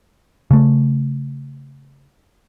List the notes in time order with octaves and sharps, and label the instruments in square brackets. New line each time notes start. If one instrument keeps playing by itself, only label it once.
[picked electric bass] C#3 A3